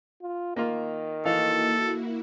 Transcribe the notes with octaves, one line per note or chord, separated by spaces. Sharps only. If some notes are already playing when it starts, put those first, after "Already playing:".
F4
D#3 A#3 F4
E3 A#3 D#4 E4 F#4 A4 F5